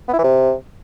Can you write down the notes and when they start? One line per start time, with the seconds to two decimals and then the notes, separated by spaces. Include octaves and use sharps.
0.08 B3
0.13 E4
0.19 E3
0.24 C3